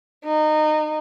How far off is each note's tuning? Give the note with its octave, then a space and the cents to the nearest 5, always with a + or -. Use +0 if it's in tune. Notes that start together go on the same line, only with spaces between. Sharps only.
D#4 -25